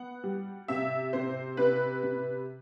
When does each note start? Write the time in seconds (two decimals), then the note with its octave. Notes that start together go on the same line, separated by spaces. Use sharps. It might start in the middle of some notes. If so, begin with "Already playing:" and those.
Already playing: B3 F#5
0.23 G3
0.68 C3 E5
1.13 C3 C5
1.57 C3 B4
2.03 C3